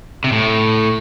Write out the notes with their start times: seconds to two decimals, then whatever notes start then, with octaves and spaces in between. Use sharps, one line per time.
0.24 C3
0.32 A2